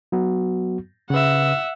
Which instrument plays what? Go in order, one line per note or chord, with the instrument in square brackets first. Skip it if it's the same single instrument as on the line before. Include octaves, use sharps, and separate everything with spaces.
[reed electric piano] F#3 B3 F#4
[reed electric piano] C#3 B4 [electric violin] E5 F#5